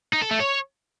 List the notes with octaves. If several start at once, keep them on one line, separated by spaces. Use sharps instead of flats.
D#4
A4
A3
C#5